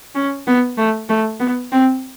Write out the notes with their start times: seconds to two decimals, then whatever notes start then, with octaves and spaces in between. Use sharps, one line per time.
0.15 C#4
0.47 B3
0.78 A3
1.09 A3
1.40 B3
1.72 C4